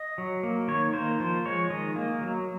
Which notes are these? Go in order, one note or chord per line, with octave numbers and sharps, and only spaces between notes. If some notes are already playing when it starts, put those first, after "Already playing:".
Already playing: D#5
F#3
A#3
D#3 C#5
A#3 C5
F3 C5
G#3 C#5
D#3 D#5
A#3
F#3